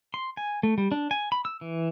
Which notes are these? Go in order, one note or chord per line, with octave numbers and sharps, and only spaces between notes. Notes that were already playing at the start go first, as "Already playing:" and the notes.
C6
G#5
A3
G3
D4
G#5
B5
E6
E3